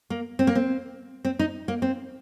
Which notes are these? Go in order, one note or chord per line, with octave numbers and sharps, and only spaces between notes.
A#3
C4
A#3
C4
C4
D#4
A#3
C4